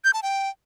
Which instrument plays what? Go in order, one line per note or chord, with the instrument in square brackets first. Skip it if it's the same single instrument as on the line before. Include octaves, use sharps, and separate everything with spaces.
[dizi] G6
A5
G5